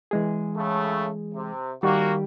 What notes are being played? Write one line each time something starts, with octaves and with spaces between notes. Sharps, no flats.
E3 G#3 G#4
A2 C#3 A3
C3
D#3 G3 A#3 F#4 G4